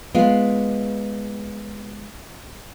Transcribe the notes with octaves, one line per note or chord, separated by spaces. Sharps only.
G#3 B3 F4